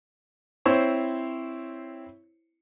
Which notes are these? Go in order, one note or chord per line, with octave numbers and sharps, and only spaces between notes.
C4 E4 C5 C#5